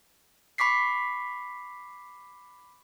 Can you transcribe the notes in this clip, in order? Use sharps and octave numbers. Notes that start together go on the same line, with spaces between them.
B5 C#6 D6 B6 C7